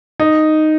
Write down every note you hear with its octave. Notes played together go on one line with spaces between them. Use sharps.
D#4